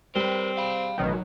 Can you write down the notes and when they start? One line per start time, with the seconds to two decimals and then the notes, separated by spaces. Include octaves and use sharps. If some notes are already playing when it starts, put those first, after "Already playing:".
0.15 G3 C4 A#4 B4
0.57 F5 B5
0.98 A1 B2 D#3 F#3